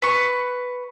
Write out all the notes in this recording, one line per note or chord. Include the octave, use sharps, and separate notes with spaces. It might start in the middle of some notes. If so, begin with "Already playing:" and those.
B4 C#6